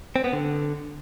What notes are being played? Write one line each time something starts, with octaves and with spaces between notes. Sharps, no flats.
C4
B3
D3